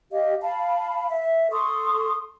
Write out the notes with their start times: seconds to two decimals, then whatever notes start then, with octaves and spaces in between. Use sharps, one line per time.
0.12 G4 D#5 F5
0.41 F5 A5 B5
1.11 E5
1.51 A4 C6 C#6 D#6